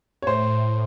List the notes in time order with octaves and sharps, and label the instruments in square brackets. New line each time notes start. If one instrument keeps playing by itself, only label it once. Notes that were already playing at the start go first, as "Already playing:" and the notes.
[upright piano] C#5
[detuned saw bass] A2 [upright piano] C5